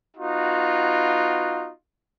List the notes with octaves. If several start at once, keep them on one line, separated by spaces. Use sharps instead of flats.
B3 D#4 F4 F#4